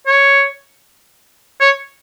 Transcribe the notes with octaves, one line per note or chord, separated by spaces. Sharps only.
C#5
C#5